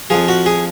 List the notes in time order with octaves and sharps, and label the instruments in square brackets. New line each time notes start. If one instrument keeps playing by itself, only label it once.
[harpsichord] F2 F3 G#4
F#4
G#4